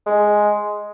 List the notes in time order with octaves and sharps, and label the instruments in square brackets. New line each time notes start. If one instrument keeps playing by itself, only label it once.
[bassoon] G#3